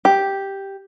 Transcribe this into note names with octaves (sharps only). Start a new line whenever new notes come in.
G4